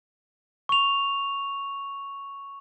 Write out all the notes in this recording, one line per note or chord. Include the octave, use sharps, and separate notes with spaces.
C#6 F7